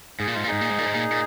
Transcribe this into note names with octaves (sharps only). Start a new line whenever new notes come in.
G#2 G#4
A#2
G#2 F4
A#2
G#2 D#4 G#4
A#2
G#2
A#2
G#2
A#2
A#2